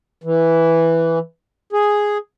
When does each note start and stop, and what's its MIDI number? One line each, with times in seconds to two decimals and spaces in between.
0.24 1.19 52
1.73 2.18 68